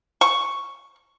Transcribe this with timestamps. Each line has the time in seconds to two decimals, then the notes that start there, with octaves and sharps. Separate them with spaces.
0.21 C#6